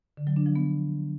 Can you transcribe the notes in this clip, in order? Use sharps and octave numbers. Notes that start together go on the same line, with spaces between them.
D3
F#3
D4
F3
B3